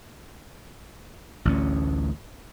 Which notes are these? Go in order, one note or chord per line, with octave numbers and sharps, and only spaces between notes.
A1 D2 C#4